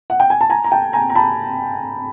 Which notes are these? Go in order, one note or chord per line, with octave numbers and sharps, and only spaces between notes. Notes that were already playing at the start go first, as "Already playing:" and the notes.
F#5
G5
G#5
A5
G#5 A#5
A#5
G5 A5
G#5 A#5
A#5
A5 B5